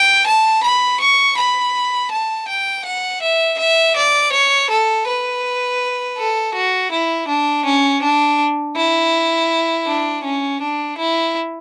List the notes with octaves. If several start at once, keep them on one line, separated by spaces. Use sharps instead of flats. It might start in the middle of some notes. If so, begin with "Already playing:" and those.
Already playing: G5
A5
B5
C#6
B5
A5
G5
F#5
E5
E5
D5
C#5
A4
B4
A4
F#4
E4
D4
C#4
D4
E4
D4
C#4
D4
E4